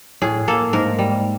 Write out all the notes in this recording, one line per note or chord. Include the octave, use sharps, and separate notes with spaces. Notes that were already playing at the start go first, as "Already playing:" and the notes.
A2 G#4
A#3 A4
G#2 A#4
G3